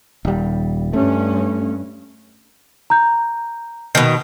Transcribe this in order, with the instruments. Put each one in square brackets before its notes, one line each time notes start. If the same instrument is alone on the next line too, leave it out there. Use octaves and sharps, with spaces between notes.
[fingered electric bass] D#1 G3
[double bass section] G2 C#4 [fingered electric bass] A3
[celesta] A#5 G6
[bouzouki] B2 D#3